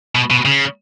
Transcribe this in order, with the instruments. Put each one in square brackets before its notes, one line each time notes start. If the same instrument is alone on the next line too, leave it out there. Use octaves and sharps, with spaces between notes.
[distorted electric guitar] B2
B2
C#3